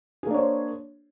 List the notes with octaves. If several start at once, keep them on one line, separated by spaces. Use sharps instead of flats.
A#3 D4 G#4 C5 C#5